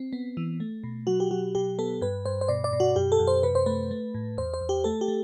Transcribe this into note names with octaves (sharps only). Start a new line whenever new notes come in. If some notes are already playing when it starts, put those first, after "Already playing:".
Already playing: C4
B3
E3
A3
B2
F#3 F#4
G4
F#3 F#4
B2 G4
B3 A4
G2 B4
G2 C5
C5
B2 D5
D5
B2
F#4
F#2 G4
A4
F#2
C5
C3 B4
C5
A3 B4
A3
A2
E2 C5
C5
E2
G4
A3 A4
G4
A3